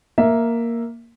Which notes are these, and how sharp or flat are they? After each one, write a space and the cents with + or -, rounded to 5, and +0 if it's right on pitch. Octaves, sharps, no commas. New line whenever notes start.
A#3 +0 E5 +0